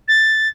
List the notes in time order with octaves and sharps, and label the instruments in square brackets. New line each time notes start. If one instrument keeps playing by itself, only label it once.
[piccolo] A6